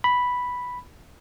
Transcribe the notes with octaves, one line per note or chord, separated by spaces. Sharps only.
B5